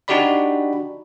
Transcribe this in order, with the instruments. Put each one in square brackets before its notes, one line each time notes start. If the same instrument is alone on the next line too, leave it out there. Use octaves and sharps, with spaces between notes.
[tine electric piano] D4 D#4 F#4 G4 D5 B5